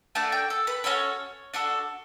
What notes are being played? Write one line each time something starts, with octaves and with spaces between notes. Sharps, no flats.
A3 D4 F#4 A5
G5
A4
B4
C#4 F#4 A4 C#5
D4 F#4 A4